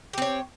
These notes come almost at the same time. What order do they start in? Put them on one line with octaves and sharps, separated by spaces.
G4 C4 C#5